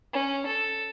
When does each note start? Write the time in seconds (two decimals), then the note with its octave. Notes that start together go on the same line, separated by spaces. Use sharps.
0.13 C#4
0.47 A4